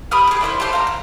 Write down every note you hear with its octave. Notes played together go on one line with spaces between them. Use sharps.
G4 B5 D#6 F6
G4 G#4
D4 E4 A#4 C5
G4 A4 C5 C6
F5 A#5
F#6